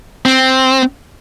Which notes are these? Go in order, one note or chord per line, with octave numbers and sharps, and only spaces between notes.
C4